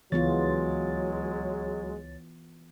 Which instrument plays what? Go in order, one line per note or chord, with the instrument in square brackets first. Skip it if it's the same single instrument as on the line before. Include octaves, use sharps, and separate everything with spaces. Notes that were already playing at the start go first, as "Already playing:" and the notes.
[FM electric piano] C#2 C#5 A6 [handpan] E3 B3 F4 [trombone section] F#3 G#3